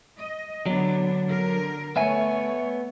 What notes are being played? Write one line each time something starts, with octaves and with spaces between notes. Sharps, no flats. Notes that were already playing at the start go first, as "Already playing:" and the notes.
D#5
D3 F#3 B3 D4
D3 A#4
A3 B3 C#5 E5 G#5